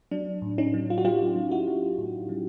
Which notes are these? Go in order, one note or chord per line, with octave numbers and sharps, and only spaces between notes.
F#3 D4
A2
C#4 D#4
F#3
F4
F#4
F#3 F4 G4
F#3
E4 F#4
F#3
A2
F#3